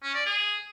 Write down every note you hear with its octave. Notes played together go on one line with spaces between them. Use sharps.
C#4
D5
G#4